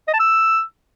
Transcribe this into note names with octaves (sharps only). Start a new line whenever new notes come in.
D#5
A5
E6